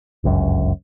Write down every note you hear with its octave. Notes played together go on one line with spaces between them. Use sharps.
G1 C#2 F#2